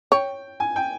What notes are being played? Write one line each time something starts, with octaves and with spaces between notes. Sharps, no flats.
C#5 G5
G#5
G5